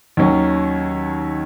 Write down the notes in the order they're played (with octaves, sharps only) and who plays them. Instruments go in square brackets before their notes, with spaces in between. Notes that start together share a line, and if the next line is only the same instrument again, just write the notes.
[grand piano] D#2 D#3 F#3 C#4